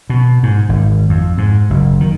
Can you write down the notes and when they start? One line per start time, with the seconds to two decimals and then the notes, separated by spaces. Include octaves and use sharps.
0.10 B2
0.43 G#2
0.69 G#1
1.09 F2
1.38 G#2
1.70 F#1
2.00 D#3